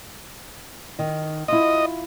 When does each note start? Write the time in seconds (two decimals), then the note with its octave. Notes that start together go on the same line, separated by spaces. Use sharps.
0.99 D#3
1.48 E4 F4 D#5